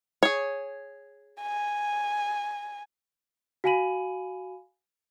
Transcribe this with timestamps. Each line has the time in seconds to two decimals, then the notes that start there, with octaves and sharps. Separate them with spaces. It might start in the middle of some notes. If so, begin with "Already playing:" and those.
0.23 G#4 C#5
1.42 G#5
3.64 F#4 F5 G#5 B5 D#7 F#7